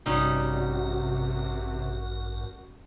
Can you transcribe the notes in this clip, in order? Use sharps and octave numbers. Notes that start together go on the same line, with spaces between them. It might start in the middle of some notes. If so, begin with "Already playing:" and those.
A1 G2 C3 G3 C#4 D#4 F#4 A#4